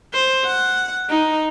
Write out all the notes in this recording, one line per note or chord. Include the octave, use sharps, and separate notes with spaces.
C5
F#5
D#4